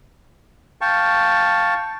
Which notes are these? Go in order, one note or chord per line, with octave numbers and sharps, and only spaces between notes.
F5 G5 A5 C#6